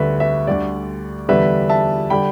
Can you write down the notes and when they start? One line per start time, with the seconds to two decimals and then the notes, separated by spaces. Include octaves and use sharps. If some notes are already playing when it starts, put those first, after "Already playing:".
Already playing: D2 D3 G3 B4 E5
0.20 B4 E5
0.47 D2 D3 G3 D5
1.29 E2 D3 G3 B4 E5
1.69 E5 A5
2.10 D3 G3 G5 B5